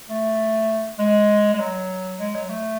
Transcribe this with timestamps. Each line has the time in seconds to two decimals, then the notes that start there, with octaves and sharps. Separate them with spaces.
0.10 A3
0.99 G#3
1.54 G#3
1.60 F#3
2.19 G#3
2.35 F#3
2.49 A3